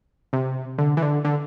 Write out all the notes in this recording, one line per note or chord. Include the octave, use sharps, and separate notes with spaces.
C3
D3
E3
D3
D3